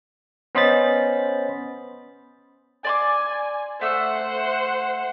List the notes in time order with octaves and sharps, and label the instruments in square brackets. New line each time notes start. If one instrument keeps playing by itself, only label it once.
[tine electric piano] B3 C#4 C5 D#5 B5 A6
[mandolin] D5 C6 D6 [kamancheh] G#5
[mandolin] A3 E6 [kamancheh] C5 F#5